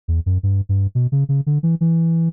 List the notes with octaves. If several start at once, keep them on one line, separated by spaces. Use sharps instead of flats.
E2
F#2
G2
G2
B2
C#3
C#3
D3
E3
E3